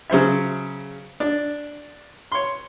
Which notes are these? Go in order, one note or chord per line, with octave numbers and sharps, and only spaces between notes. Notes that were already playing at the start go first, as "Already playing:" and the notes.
C#3 F#3 C5 E5
D4
C#5 C6